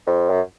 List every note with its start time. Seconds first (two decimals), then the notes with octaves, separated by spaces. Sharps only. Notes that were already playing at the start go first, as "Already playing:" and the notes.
0.07 F2
0.30 F#2